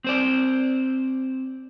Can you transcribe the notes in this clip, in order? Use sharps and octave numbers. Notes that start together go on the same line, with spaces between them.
C4 C5 D5